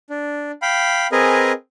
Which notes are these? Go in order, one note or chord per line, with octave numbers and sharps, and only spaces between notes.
D4
F5 G5 B5
C4 G#4 A#4 B4 D#5 G#5